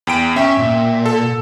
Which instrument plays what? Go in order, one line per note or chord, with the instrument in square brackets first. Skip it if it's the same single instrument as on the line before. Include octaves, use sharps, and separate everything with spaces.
[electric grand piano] E2 G5 D7
[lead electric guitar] C#4 [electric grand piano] E5 G5
[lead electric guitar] A#2
[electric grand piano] A4